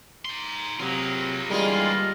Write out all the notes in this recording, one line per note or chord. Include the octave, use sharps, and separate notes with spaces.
D#4 C6
C3 F#3 A#3 F4 G#4
D#2 D3 E3 G3 G#3 A#3 F4 G#4